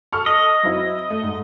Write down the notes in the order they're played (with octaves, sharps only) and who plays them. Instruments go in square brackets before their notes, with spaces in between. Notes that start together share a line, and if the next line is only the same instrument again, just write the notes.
[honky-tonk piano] A4 C#6 F6
[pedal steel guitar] D#5
[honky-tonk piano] F#3 C4 E4
A3
G#2